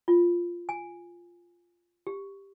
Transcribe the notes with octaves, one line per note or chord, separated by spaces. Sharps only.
F4
G#5
G4